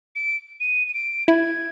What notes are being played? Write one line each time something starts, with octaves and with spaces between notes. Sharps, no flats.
D7
D#7
D#7
D7
E4 G#6